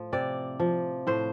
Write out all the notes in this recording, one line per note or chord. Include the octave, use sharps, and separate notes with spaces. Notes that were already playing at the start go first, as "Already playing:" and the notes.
Already playing: A2 F3
C3 D5
F3
A2 C5